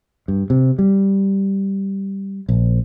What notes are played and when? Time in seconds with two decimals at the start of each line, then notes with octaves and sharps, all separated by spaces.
0.28 G2
0.50 C3
0.79 G3
2.49 A#1